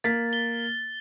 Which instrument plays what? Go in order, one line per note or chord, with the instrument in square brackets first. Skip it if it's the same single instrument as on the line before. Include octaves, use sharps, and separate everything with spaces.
[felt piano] A#3 B6 [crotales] A6
[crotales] G7